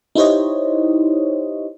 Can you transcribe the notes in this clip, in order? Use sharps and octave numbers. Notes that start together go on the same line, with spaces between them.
D#4 E4 G4 C5 C#5 D#5